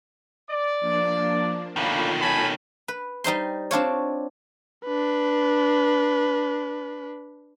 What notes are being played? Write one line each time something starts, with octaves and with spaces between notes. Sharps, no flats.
D5
F3 A#3 D4
B2 D#3 D4 F4 A4 C#5 F5 B5
G#5 A5 B5
B4
G3 D#4 C5 C6
C4 D4 F4 C#5
D4 B4